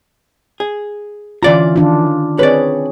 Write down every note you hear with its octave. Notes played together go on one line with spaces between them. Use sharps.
G#4
D3 E3 C#4 F4 D5 A#5
D#3 D4 F4
C4 G#4 B4 C#5 D5